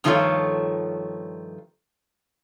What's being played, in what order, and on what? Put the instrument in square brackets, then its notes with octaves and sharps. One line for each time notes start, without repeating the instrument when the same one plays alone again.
[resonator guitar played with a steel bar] G2 D#3 F3 A3 F4 C#5